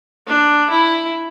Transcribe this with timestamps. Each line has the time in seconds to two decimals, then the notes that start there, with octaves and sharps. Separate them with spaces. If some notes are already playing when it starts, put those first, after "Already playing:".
0.27 D4
0.70 E4